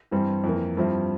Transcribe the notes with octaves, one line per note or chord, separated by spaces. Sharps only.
G2 E3 G3 C4
F2 E3 A#3
G2 F3 C4 E4